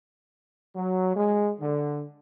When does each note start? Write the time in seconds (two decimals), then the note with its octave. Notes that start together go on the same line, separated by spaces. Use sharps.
0.75 F#3
1.16 G#3
1.60 D3